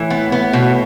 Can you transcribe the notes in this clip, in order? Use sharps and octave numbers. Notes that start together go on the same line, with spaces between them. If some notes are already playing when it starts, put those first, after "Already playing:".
Already playing: A2 E3
B3
B3
B2